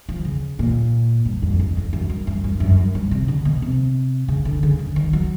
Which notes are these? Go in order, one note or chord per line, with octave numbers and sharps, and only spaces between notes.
F3
C#3
A#2
G2
F2
F2
F2
F#2
G2
F#2
G2
F#2
G2
G2
C3
D3
B2
C3
C#3
D3
C#3
D3
D#3
F#3